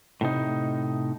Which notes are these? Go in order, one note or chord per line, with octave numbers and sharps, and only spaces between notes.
A2 C3 D#4